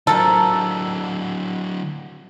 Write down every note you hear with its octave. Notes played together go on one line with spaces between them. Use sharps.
D3 F#3 F4 A4 A#4 C5